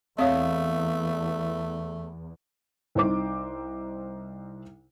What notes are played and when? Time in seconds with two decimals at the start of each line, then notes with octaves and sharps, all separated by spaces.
0.18 E2 A3 C4 C#5 D#5 F5 D#6
2.95 C2 D#4 C5 D6